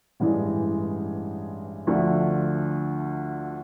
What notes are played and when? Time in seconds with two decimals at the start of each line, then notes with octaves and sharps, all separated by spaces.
0.20 A1 G2 E3 G#3
1.87 D2 D3 F3 A3